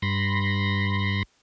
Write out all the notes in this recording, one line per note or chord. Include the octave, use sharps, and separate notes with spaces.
G2 B5 C6 A#6